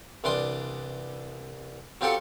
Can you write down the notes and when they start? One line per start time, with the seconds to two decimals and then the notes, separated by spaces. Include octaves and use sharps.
0.24 C2 E3 D4 D5 C6 D#6
2.01 F#3 C4 F4 G4 A4 F#5